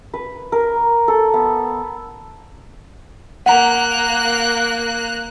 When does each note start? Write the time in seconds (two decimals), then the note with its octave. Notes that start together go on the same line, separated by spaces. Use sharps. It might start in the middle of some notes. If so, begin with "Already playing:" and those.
0.14 B4
0.52 A#4
1.08 A4
1.34 B3
3.46 A#3 F#5 A#5 F#6